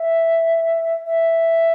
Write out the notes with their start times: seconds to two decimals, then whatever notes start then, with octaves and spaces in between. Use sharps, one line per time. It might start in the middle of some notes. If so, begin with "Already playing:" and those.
Already playing: E5
1.07 E5